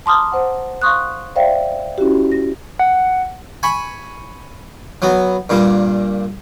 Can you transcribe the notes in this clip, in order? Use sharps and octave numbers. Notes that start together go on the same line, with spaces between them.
A5 A#5 C6 D6 D#6 F6
C5 F#5
F5 C6 C#6 D#6 F#6
C5 D5 E5 F5 G5
C#4 E4 F#4 G4
A#6
F#5
G#5 B5 C#6
F#3 B3
G2 A#2 G3